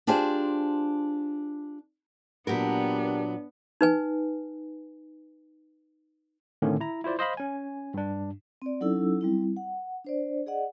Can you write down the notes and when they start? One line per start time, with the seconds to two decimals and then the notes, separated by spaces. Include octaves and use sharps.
0.07 D4 F4 G4 G#4 C5
2.47 A#2 F#3 B3 D4 G4 A#4 B4
3.81 D#4 B4 G#5
6.62 A2 D3 D#3 A3 C4 C#4
6.80 E4 A#5
7.04 E4 F4 C5 D5
7.19 C5 D#5 F5 B5
7.37 C#4 G#5
7.94 G2 D4
8.62 C4 D5
8.81 F#3 C#4 D#4 E4 A4 E6
9.21 G3 C4 E4
9.57 F#5
10.05 D4 C5 D5
10.46 G#4 D5 D#5 F#5